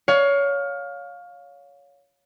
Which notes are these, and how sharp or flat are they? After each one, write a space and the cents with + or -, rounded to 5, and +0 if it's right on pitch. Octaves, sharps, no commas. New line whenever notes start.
C#5 +20 F5 +20